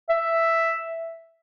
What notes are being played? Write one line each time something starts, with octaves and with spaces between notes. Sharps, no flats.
E5